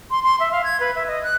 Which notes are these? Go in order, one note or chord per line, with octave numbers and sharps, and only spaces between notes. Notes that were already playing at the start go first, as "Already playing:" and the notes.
C6
C6
E5
F5
G#6
B4
E5
D#5
F#6